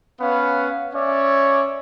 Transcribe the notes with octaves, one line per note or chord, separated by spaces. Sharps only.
B3 C#4 B4 F5
C#4 C#5 D5 E5